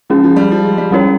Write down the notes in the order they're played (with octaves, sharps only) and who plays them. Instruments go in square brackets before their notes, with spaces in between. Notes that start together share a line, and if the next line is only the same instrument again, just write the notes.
[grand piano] F3 [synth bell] G#3 C#4 G#4
[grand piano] F3
G3
F3
G#3
G3
[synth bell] G3 C#4 F4 A#4 C#5